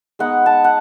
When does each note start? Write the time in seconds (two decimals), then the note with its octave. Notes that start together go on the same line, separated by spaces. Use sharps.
0.19 G#3 B3 D#4 F#5
0.46 A5
0.64 F#5